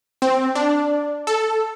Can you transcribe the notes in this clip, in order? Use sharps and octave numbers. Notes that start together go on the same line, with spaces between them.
C4
D4
A4